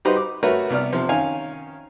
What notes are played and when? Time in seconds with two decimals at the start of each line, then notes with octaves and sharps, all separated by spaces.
0.05 G3 D#4 F#4 G4 B4 C5
0.17 D6
0.43 A3 F#4 A#4 B4 C#5
0.70 C2 B3 D5 F6
0.93 C3 F3
1.09 D#3 C#4 F5 G#5